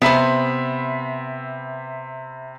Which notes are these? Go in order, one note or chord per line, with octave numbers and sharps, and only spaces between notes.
C3 B3 C5 E5 B5